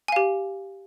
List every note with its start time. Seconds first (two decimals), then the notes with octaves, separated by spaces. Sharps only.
0.08 G#5
0.12 F5
0.16 G4